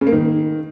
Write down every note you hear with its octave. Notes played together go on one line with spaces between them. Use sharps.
C#3
A#3
D#3